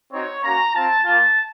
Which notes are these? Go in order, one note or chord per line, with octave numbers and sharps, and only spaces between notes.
C4 D#4 F#4 C#5
A#3 C#4 F#4 A#5
C4 F4 A5
A#3 F4 A5